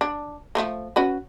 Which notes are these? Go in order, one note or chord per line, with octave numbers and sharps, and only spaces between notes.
D4
F3 A3 A#3
C#4 F#4 B4